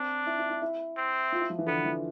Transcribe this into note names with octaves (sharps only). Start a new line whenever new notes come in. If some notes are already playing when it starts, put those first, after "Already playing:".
Already playing: C4 D4
E4
E4
E4
E4
C4
F4
E4
F3
E3
D3 B3
E3